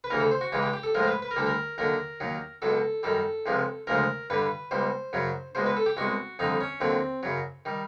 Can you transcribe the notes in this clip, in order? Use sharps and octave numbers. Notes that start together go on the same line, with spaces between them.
B4
D2 C#3 E3 A#4
A4
C5
F#4
C#2 C#3 E3 G#3 G4
G4
G4
A4
A2 F3 G#3 A#4
C5
B4
B4
A#4
D2 D3 G3 A4
A#4
D#2 D3 F#3 A#4
D#2 D#3 F#3
C#2 B2 F#3 A4
F#2 D#3 G3 A4
C#2 C3 F3 G#3
D2 C#3 F3 G#3 A#4
G2 D3 G3 B4
C#2 B2 G3 C5
F#2 C#3 F#3
C#2 B2 G#3 C5
B4
A4
G4
C2 B2 G#3 F#4
F2 D3 G3 D#4
C#4
D#2 D3 F#3 C4
F#2 C#3 F#3
D#3 G3